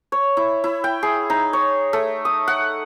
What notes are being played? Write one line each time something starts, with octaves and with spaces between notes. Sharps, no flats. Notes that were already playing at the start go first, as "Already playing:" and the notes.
C#5
E4
E4
G5
G#4
D#4
C#5
A3
D#6
F#5